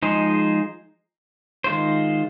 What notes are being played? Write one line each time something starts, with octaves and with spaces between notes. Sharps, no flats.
F3 G#3 D#4 G#4 C5
D#3 G#3 F4 C5